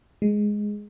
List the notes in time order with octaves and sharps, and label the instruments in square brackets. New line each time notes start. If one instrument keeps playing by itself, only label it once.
[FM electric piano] G#3